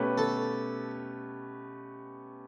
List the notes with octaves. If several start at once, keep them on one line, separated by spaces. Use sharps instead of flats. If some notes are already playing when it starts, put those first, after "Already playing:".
Already playing: B2 A3 C#4 G4 B4
A4